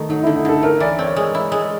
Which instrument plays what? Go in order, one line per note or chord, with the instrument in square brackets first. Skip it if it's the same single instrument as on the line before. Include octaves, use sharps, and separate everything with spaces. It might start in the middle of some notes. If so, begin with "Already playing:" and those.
Already playing: [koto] D#3 [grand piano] A3
[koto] F#3 [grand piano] D#4
[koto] D3 [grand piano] E4
[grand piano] D#4
[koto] D3 [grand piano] A4
[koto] A3 [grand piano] A#4
[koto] E3 [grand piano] D5
[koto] C4 [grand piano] C#5
[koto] G#3
E4
G#3